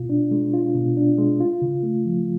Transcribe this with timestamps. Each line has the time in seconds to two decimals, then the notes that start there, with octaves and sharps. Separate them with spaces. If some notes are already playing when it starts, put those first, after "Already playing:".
Already playing: B2 F4
0.10 D4
0.31 G#3
0.54 F4
0.75 B2
0.97 D4
1.18 G#3
1.40 F4
1.62 C#3
1.83 A3
2.05 F3